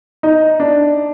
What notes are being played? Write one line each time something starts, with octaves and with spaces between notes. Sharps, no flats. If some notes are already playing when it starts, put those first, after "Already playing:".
D#4
D4